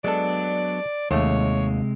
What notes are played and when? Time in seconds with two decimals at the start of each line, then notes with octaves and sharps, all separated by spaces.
0.04 F#3 G#3 B3 D4 A4 D5
1.11 D#2 C3 G#3 A3 C#5